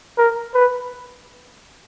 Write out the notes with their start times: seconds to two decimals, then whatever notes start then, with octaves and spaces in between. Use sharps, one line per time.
0.18 A#4
0.54 B4